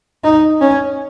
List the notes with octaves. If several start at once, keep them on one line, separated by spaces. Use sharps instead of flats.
D#4
C#4